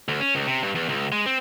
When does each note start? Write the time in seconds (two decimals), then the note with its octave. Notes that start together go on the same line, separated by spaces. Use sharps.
0.08 D2
0.20 C#4
0.35 C#2
0.47 C3
0.63 G2
0.75 E2
0.89 C#2
1.12 G#3
1.26 C4